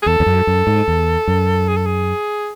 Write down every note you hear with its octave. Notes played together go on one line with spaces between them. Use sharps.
G#4
E2 A4
E2
F#2
F#2
G#2
E2
F#2
G#4
A4
G#4